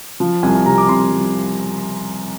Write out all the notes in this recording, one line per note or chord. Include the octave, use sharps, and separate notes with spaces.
F3
C2 G#5
C3 A#5
D6
C2 C6
F3